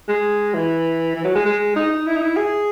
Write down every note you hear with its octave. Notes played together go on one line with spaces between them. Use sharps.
G#3
E3
E3
F#3
G#3
G#3
D#4
D#4
E4
D#4
E4
G#4